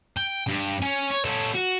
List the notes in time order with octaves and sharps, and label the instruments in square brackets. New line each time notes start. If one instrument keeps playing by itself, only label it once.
[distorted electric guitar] G5
G2
C#4
C#5
C#4 A4
F#4